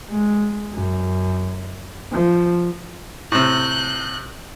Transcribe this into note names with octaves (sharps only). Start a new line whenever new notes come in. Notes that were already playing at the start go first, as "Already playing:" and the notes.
G#3
F#2
F3
A2 C3 F#6 G6